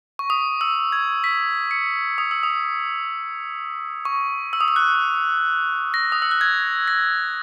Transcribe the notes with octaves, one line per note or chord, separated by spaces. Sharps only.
C#6
D#6
E6
G#6
B6
C#7
D#6
E6
D#6
C#6
E6
D#6
E6
F#6
A#6
D#6
E6
F#6
G#6
A#6